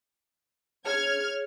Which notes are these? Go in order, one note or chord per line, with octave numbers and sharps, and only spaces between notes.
G#4 C#5 F6 G#6